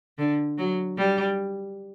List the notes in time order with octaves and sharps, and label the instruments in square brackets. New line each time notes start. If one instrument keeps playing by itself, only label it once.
[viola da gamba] D3
F#3
G3